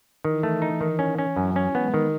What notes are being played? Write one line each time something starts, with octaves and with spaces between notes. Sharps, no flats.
D#3 E3
A3
E3 D#4
D#3
C#4
C#4
F#2 F#3
C#4
G#3 B3
D#3